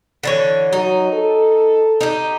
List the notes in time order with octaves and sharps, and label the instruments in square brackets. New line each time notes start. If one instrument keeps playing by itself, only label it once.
[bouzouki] D3 E3 C#5
[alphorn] F#3 [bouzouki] D#4
[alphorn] A4
[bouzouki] D#4 G4